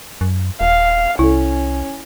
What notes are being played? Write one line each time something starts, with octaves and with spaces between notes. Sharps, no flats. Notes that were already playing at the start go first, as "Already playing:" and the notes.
F#2
D#1 F5
C2 C#4 E4 A4